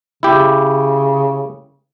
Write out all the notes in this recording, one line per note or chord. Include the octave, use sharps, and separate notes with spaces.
C#3 E4 G4